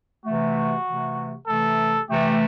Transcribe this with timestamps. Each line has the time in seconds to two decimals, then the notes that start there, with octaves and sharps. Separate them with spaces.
0.25 C3 E3 A3 F#4
0.87 C3 E3 A3
1.47 C3 E3 A3 A4
2.09 C3 E3 A3 G4